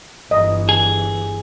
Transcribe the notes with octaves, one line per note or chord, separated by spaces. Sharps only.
G1 E3 D#5
G#4